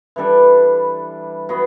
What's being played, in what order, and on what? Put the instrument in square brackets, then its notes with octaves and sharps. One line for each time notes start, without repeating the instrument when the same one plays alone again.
[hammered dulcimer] E3 G3 D4 A4
F#3 B3